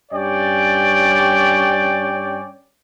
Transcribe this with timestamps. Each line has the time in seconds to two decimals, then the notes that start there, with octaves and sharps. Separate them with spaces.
0.12 G2 C#4 C#5 D5 G5